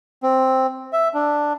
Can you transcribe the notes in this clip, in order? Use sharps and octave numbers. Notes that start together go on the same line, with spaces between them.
C4
E5
D4